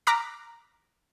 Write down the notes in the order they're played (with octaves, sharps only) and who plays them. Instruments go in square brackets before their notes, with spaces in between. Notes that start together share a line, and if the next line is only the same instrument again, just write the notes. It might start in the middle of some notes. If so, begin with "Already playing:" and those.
[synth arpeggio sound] A#5 D6 F6 F#6 A#6 B6